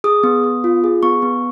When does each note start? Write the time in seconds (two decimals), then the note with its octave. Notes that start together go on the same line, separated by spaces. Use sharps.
0.04 G#4 D#6
0.23 B3
0.44 B3
0.64 F4
0.84 G#4
1.03 B3 C#6
1.22 B3